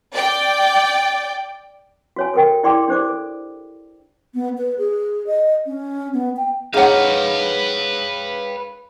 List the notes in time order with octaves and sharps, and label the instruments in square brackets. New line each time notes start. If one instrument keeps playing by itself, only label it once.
[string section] D5 G5
[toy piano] F#4 C#5 G#5
A4 A#4 G5
E4 G#4 D5 G5 C6 D6
D4 G4 C5 D5 D6
A4
[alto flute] B3
B4
G#4
D#5
C#4
B3
G5
[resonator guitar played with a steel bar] D#4 F#5 [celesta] G#4 C#5 [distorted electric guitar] B4 F5